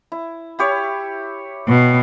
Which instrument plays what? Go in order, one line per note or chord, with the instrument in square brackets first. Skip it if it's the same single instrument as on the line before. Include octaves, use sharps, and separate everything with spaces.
[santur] E4
E4 G4 C#5
[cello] B2